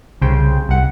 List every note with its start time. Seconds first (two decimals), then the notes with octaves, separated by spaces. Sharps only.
0.21 C2 C#3 C5 G5
0.69 C2 F#5